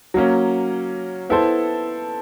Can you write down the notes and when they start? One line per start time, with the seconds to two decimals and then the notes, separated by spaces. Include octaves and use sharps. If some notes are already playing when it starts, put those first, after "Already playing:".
0.14 F#3 A#3 C#4
1.30 B3 E4 A4 C5